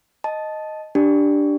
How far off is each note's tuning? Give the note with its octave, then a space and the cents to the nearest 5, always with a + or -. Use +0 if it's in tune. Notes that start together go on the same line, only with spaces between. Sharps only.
D#5 +0 A5 -10
D4 +0 G4 +0